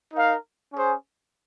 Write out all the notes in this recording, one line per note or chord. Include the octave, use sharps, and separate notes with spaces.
D#4 A#4 F5
C#4 G#4 C5